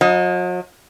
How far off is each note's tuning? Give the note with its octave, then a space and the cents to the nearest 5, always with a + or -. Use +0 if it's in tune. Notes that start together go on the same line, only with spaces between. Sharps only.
F#3 -45 D#5 +15